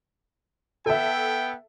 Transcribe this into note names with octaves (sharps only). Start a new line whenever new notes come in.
B3 A4 E5 G5